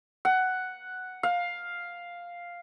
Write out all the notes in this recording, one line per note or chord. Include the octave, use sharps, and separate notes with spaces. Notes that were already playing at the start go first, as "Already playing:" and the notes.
F#5
F5